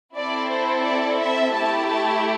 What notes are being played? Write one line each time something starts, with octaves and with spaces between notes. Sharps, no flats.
C4 E4 A4 D5
C5
D5
E5
A3 E4 G4 A5
A5